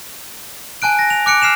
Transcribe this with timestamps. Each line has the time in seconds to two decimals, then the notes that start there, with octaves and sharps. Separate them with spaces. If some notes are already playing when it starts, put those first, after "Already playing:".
0.82 G#5 A5 F#6 D7
0.99 A#6
1.10 F7
1.26 D6 F#6 C#7 D7
1.42 F6 C7 E7 F7